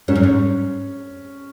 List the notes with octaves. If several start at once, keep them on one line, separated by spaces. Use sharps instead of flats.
G#2 C#4
F#2
G#2